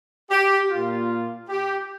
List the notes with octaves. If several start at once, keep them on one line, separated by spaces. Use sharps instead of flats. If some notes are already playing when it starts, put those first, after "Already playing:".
G4
A#2 A#3 F4
G4